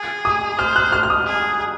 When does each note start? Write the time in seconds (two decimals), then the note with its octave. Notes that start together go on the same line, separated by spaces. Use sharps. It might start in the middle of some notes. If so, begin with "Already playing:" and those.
Already playing: G#4
0.25 D#6
0.59 C5 F6
0.76 F#6
0.92 F6
1.03 F6
1.10 D#6
1.27 G#4